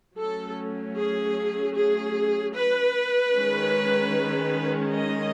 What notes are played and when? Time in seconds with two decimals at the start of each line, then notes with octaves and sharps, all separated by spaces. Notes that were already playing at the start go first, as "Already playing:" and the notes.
0.17 F#3 A3 C#4 A4
0.97 G#4
1.75 G#4
2.54 B4
3.35 D#3 G#3 C#4
4.92 D#5